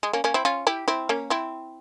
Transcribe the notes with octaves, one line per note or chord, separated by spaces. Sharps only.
G#3
A#3 C#4
A#3 C#4
C4 E4
C#4 F4
E4 G4
C4 E4
A#3 C#4
C4 E4